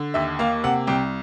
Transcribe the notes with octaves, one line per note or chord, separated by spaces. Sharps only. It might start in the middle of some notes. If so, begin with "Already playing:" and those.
Already playing: D3
D#2 E5
A#3 F5
C3 F#5
C2 G5